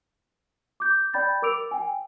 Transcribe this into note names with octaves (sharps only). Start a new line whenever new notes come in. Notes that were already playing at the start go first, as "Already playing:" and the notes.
D6 G6
D5 G5 B5 G6 A6
A#4 D6 E6 D7 F7
G5 G#5